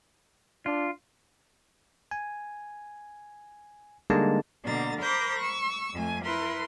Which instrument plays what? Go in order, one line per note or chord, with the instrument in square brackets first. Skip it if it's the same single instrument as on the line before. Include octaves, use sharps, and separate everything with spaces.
[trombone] D4 [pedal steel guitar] F4
[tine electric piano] G#5
D3 G3 G#3 A#3 D#4 A5
[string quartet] B2 D3 A#3 A#5 A6
A#4 C5 B5 D6 G6 A#6
C#6 E6
F2 A3 G#5
E4 A#4 B4 C6